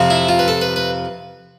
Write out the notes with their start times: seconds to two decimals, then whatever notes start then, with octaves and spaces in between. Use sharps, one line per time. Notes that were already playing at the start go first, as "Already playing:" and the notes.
Already playing: F2 C3 F3 C4
0.10 E4
0.29 F4
0.39 B4
0.48 A4
0.62 B4
0.76 B4